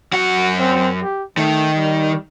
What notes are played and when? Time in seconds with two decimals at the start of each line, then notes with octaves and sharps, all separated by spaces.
0.13 F#2 F#4 F#5
0.59 C4
1.03 G4
1.37 D#3 A3
1.75 G3